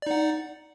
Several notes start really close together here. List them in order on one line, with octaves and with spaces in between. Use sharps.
D5 D#4 F#5